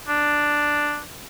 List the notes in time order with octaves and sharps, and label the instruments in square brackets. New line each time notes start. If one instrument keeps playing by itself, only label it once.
[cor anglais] D4